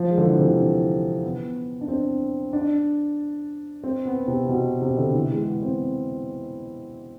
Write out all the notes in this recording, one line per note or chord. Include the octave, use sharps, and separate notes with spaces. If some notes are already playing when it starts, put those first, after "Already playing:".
Already playing: F3
G#3
D3
E3
C3
D3
E3
B3
D4
C4
D4
C4
B3
C3
B2
C3
D3
E3
G#3
B3
C4